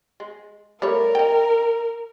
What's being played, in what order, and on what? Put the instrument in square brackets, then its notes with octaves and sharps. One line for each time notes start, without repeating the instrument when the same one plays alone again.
[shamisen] G#3
[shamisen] G3 A3 C#5 [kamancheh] A#4
[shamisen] D#5 G5